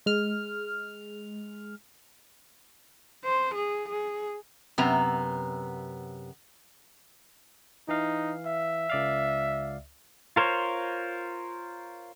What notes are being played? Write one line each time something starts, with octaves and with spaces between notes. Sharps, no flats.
G#3 F6
C5
G#4
G#4
F#2 C3 B3 A#5
E3 D#4 F5
E5
C#2 D5 F5
F4 A#4 C5 C#5